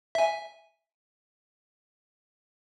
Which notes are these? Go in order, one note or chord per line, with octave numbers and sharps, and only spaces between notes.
E5 G#5